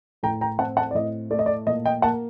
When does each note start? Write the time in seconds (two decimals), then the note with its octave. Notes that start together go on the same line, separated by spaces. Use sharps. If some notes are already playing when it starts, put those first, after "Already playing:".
0.23 A2 G5 A#5
0.41 G5 A#5
0.59 C4 F#5 A5
0.77 F#5 A5
0.91 D5
0.95 A2 D#5
1.31 A3 D5
1.39 D#5
1.46 D5
1.66 A#2 D#5
1.86 D#5 G5
2.02 A#3 F#5 A5